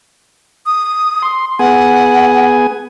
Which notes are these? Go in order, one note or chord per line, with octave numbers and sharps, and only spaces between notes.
D#6
C6
B3 G#4 F#5 G#5